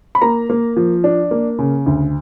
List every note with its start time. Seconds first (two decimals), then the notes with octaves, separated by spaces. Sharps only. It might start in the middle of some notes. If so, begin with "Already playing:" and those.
0.15 B5
0.22 A#3 A#5
0.50 A#3
0.77 F3
1.04 D4
1.31 A#3
1.59 C#3
1.86 D2